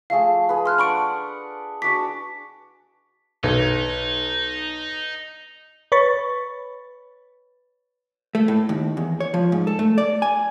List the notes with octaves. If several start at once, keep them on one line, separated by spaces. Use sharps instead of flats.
F3 A3 G#4 F5
G#4 B4
C6 F6 F#6
D4 F#5 B5 C#6 D7
D4 F#4 D6 B6
B1 D#4
B4 C#5 B5 C#6 A6
A3
A2
D#2
E2
C#5
F3
G#2
A4
A3
D5
G#5